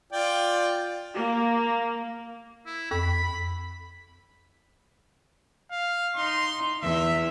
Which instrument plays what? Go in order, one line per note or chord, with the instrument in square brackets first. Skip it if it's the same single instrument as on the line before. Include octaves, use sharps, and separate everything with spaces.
[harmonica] F4 D5 G5
[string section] A#3
[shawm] E4
[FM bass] F2 [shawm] B5
[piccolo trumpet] F5
[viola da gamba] D#4 [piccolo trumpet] C6
[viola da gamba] E2 [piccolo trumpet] E5